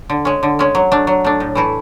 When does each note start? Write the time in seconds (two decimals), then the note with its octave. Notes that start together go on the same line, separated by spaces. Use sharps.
0.10 D3
0.25 G#3 C#4
0.43 D3
0.59 G#3 C#4
0.75 F#3
0.92 A3 D4
1.07 F#3
1.24 A3 D4
1.40 A2
1.55 E3 A3 E4